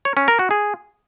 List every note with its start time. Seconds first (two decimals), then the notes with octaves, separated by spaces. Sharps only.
0.05 C#5
0.17 C#4
0.28 A#4
0.39 F#4
0.51 G#4